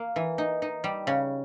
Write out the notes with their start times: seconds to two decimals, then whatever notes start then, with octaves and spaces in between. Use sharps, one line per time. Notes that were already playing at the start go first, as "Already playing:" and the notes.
Already playing: A#3
0.16 E3
0.38 D#4
0.62 D#4
0.84 G3
1.07 C#3